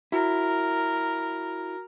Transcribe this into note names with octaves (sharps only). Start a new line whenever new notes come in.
E4 F#4 A#4